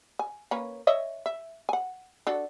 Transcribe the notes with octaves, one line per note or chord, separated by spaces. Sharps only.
G#5
A#3 C#4 B4
C#5 D#5 E5
E5
F#5 G#5
D4 F#4 A4